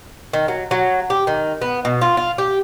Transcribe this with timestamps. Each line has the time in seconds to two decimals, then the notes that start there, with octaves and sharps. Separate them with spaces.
0.33 D#3
0.48 F#3
0.71 F#3
1.10 G4
1.27 D#3
1.61 B3
1.85 B2
2.01 F4
2.17 F4
2.38 G4